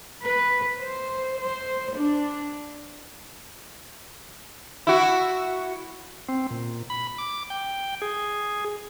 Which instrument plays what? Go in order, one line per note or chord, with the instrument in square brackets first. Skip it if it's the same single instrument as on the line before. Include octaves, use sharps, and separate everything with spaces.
[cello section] B4
C5
C5
D4
[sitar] E4 F#4
[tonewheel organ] C4
A#2
B5
D6
G5
G#4